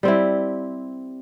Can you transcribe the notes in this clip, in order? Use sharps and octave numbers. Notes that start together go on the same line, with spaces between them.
G3 C4 E4